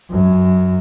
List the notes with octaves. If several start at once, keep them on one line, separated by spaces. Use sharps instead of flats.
F#2